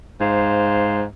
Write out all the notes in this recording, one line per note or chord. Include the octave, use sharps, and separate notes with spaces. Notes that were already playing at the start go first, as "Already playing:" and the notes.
G#2 C5 F5